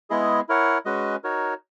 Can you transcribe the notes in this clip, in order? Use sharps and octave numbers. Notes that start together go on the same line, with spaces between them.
G#3 B3 E4 G#4 D#5
E4 A#4 C#5 F#5
G#3 C#4 F#4 B4 D#5
D#4 F#4 A#4 C#5